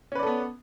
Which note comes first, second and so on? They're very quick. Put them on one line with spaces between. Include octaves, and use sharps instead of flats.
C#4 B4 D5 A4 B3